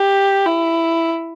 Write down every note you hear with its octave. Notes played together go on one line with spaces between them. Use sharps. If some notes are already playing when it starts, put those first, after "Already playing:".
Already playing: G4
E4